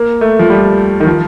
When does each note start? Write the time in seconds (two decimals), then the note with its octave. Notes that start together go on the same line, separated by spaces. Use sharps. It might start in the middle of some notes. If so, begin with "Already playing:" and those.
Already playing: A#3
0.21 A3
0.39 F3
0.50 G3
1.00 D#3
1.07 F3